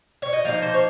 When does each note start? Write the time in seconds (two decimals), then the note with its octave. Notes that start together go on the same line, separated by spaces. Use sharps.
0.22 C#5
0.33 D#5
0.45 F3 A#3 D#4 F5
0.62 C5
0.74 C#5